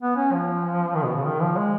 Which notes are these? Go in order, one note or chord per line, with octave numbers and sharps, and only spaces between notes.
B3
C#4
F3
D#3
B2
C#3
D#3
F3
G#3